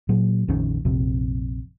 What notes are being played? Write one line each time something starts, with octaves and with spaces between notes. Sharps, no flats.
A#2 F#3
A#1 F2 D#3 C#4
A#1 F2 C3